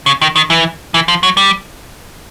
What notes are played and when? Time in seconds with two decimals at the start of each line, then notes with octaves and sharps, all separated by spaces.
0.06 C#3
0.22 D#3
0.36 D#3
0.50 E3
0.94 E3
1.08 F3
1.23 F#3
1.37 G3